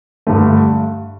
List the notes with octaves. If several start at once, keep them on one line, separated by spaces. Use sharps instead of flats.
G2 D3 A3